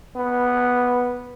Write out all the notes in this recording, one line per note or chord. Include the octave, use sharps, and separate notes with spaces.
B3